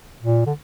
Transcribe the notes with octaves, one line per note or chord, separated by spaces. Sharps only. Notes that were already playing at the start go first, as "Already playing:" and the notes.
A#2
D3